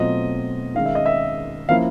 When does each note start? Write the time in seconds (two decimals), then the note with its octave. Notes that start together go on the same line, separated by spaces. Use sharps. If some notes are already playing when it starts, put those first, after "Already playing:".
Already playing: B2 F#3 A3 C4 F4 D#5
0.75 D#3 G#3 C#4 F5
0.86 E5
0.95 D#5
1.06 E5
1.69 F3 A#3 C#4 E4 F5